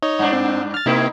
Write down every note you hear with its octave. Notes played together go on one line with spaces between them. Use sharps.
D#4 C#5 D#5
G2 D4
C4
F6 A6
C3 A#3 B3 D#4 E4